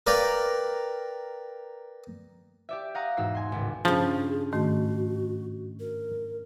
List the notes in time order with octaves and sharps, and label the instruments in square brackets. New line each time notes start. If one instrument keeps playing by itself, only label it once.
[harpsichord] A#4 B4 D5 F5 G5
[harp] G4 D5 E5
F5 F#5 A#5 C#6 D#6 F6
E1 G#2 D#4 F#4 E6 C7
G#5 C6
G#1 C#2 A2
[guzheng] G2 C#3 [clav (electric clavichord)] F3 [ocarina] G#4
[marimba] G#2 D#3 A3 [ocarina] F#4
[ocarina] A#4